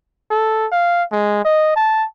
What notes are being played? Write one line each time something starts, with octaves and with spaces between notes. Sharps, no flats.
A4
F5
G#3
D#5
A5